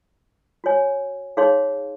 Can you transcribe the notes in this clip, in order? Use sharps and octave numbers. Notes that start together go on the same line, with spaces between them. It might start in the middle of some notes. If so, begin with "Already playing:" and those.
F#4 C#5 G#5
D#4 G#4 C#5 F5 C6